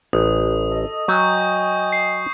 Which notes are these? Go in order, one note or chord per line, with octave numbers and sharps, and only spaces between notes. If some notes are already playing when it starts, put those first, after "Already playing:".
A1 D#6
A4 D#5
F#3 D#5 G5 G#5 C#6 G6
C7